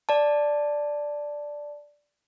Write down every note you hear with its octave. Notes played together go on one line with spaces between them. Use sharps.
D5 A5